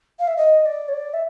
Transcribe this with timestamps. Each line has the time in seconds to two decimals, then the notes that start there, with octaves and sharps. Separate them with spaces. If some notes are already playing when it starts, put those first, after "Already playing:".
0.19 F5
0.27 E5
0.37 D#5
0.65 D5
0.88 C#5
0.93 D5
1.13 E5